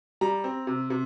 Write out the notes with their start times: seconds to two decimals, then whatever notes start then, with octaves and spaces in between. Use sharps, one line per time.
0.21 G3 A#5
0.44 C4
0.67 C3
0.90 C3